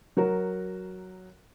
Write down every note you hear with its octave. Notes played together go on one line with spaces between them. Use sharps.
F#3 F#4 A#4